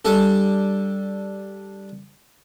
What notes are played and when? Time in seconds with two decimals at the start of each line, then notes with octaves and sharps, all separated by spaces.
0.05 G3 D4 A4